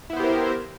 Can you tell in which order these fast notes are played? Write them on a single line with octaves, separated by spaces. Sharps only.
E4 B3 C5 G4 A#4